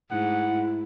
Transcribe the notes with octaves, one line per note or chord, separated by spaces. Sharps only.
G#2 A3 E4 F#5